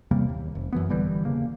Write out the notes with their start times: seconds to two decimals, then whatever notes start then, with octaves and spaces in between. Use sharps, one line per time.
0.11 E2 C3 G3 A#3
0.29 D#2
0.55 F1
0.73 F#2 E3 B3
0.89 G#1 D3 E3 G3
1.25 E1 C#3 A#3